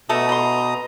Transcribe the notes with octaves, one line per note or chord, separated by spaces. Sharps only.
B2 A3 D4 A4 A#5 D#6
B4 C6